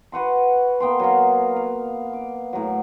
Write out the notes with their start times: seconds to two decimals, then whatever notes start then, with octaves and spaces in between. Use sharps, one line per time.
0.12 F#4 B4 F#5 C6
0.80 A#3 B3 G5 C6
1.00 F#3 F#4 F5
1.56 F5
2.13 D6
2.53 A2 F#3